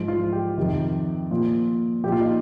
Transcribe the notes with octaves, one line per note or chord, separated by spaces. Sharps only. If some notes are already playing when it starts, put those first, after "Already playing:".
Already playing: G#2 F3
F4
G4
F2 C3 D#3
A#2 F3
A#2 F3 G4
F4
D#4